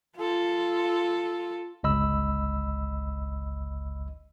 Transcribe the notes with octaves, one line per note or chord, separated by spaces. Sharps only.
F4 A4
G1 C#2 D#5 B5 E6